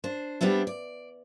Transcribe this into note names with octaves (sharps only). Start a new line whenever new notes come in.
D4 C5
G3 B3 C4 D4 E4
D5